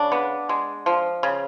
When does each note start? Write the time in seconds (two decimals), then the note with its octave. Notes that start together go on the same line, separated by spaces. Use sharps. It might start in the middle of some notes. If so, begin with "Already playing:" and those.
Already playing: C#3 D4
0.12 B3
0.49 G#3
0.86 F3
1.23 C#3